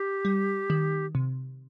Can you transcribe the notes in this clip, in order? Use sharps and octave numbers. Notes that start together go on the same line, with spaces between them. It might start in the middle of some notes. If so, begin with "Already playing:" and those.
Already playing: G4
G3
D#3
C3